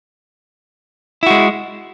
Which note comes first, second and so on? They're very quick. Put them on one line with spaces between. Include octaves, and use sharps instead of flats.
E4 F#4 G#3